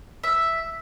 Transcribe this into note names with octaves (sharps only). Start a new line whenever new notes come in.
E5